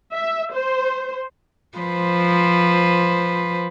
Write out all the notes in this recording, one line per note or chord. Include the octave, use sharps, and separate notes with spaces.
E5
C5
F3 B4 C5